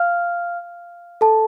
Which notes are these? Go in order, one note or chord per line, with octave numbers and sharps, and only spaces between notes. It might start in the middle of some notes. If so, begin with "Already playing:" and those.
Already playing: F5 F6
A4 A5